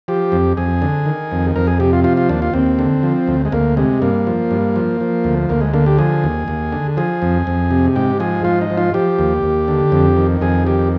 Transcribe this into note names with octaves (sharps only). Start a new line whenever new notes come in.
F3 G4
F2
F2 G#4
D3
D#3
F2
F2 A#4
G#4
C3 G4
F4
F3 F4
F4
D#2 D4
F4
D#2 C4
D3
F3
D2
G#3
D2 A#3
C3 G#3
G2 A#3
F3
G2
F3
F3
D2
D2 A#3
G#3
D3 A#3
G4
F3 G#4
D#2
D#2
D3
F3 G#4
F2
F2
C3
G#2 G4
F3 G#4
G#2 F4
D#4
F3
F4
F3 G4
D#2
D#2
D3
F2
D#3
F2 G#4
D#3 G4